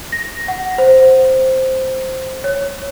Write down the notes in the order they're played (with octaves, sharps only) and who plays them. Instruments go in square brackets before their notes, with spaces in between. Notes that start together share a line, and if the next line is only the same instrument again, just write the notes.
[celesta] A#6
F#5
C5
C#5